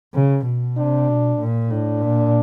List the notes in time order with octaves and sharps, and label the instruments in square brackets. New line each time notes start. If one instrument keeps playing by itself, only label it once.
[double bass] C#3
B2
[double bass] C3 [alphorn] D4
[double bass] B2
A#2
[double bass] A2 [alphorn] D4
[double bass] A#2